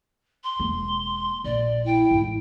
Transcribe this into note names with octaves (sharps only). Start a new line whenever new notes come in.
C6
E1 A#3
A#1 D5
E4 G5
A1 G#2